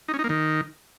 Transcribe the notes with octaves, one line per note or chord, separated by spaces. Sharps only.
D#4
C#4
D#4
A#3
D#3